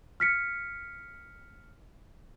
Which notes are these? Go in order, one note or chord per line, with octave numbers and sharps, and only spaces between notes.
F6 B6 C#7